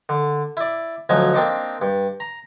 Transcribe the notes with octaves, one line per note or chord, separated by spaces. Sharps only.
D3
E4 D5
D2 F3 F#3 D#5 G#5
A#3 C4 D4 D#4
G2
A#5